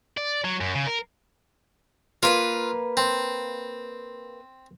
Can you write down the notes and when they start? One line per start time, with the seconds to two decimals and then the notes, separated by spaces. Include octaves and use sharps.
0.17 D5
0.44 F#3
0.60 F#2
0.75 C#3
0.87 A#4
2.23 A#3 F4 B4 F5
2.97 C4